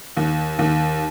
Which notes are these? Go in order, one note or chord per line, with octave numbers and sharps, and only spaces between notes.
D#2
D#2